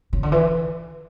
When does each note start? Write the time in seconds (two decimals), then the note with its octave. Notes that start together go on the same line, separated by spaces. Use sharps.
0.13 C#3
0.23 D3
0.32 E3